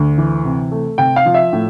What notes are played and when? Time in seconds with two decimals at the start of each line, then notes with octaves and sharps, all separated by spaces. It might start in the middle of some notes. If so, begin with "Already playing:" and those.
Already playing: D2
0.18 E3
0.45 C3
0.71 A3
0.98 C3 G5
1.16 F5
1.26 F3
1.34 E5
1.53 A2